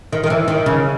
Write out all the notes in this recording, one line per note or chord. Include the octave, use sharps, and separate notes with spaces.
D#3
D#3
E3
D#3
C#3